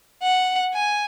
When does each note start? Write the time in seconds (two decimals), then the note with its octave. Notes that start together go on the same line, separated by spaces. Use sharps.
0.23 F#5
0.73 G#5